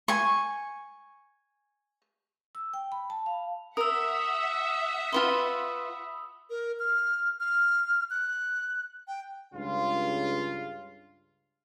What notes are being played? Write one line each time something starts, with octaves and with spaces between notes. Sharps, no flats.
G#5 C#6
E6
G5
B5
A5
F5
A#4 E5 F#5 D#6 E6
F4 B4 C6
A#4
F6
F6
F#6
G5
C#2 G2 C#3 F4